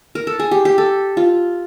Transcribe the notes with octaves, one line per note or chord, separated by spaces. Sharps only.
A#4
A4
G#4
G4
G4
A4
F4